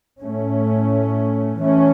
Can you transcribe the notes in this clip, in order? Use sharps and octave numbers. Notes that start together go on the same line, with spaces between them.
A2 A3 C#4
E3 A3 C#4